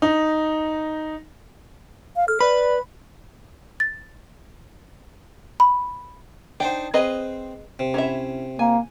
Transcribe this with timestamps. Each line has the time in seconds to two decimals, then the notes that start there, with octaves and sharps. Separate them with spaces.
0.02 D#4
2.16 F5
2.28 A4 F6
2.40 B4 D5 B5
3.80 A6
5.60 B5
6.60 D4 D#4 C5 G5
6.94 C4 G#4 B4 D#5
7.79 C3
7.94 C#4 E4 E5
8.59 A#3 G#5